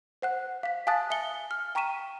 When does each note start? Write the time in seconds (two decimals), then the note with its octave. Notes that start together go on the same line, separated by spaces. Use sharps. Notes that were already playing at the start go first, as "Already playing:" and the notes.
0.22 C5 F#5 F#6
0.63 F5 B6
0.87 F5 G#5 A5 D#6 F#6 A6
1.10 E5 G#5 C#7 G7
1.51 F6
1.75 G5 A#5 C#6 B6 D#7 E7